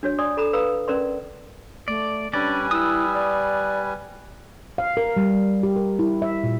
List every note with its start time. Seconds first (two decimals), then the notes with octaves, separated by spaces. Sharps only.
0.03 D4 F#4 C#5
0.18 D5 G#5 C6 D#6
0.37 A4 A#5 B5
0.53 B4 F5 A#5 B5 D#6 E6
0.88 C#4 A#4 B4 D5 A#5 C6
1.88 A3 D5
2.33 G3 C#4 D4 B4 D5 G#5
2.71 E4 D#6 E6
3.13 D5
4.78 F5
4.97 A#4
5.17 G3
5.63 G4
5.76 A#4
5.99 E4
6.22 E5
6.44 A#2